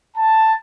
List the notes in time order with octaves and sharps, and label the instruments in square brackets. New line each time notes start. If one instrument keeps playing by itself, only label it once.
[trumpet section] A5